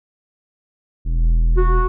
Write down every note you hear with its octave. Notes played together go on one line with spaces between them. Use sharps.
E1
F#4